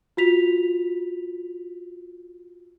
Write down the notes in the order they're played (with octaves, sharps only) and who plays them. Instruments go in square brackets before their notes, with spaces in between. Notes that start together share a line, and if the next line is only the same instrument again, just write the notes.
[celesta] F4 F#4 B6 F7